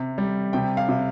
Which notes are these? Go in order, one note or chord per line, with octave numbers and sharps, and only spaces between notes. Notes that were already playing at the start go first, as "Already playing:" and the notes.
Already playing: C3
G3
C3 G5
F5
C3